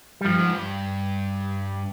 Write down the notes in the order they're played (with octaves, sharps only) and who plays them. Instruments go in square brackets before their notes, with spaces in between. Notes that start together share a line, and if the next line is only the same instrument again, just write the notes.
[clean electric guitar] G3
[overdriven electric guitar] G2 [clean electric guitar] F3
[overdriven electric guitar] G#2
G2